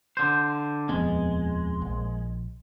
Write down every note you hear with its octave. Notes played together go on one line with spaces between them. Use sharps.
D3 C5
D#1 F2 G#3 B3
A#1